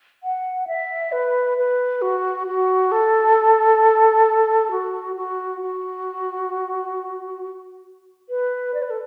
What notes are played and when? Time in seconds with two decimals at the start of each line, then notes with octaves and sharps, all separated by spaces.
0.23 F#5
0.67 E5
1.12 B4
1.58 B4
2.02 F#4
2.47 F#4
2.92 A4
4.71 F#4
5.16 F#4
5.61 F#4
8.29 B4
8.74 D5
8.82 B4
8.90 A4